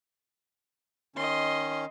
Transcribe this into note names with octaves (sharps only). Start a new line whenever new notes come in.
D#3 C#4 D#5 C6